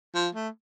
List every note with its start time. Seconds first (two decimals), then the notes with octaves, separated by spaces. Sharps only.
0.15 F3
0.35 A3